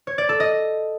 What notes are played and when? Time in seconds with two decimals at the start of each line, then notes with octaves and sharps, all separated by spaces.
0.07 C#5
0.18 D5
0.29 A4
0.40 D#5